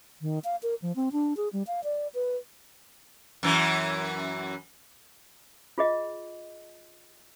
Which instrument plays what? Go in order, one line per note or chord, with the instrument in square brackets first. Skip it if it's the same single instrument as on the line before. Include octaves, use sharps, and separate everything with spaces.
[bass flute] D#3
F5
A#4
F3
C4
D4
G#4
G3
F5
D5
B4
[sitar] F#2 E3
[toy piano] F4 G#4 D#5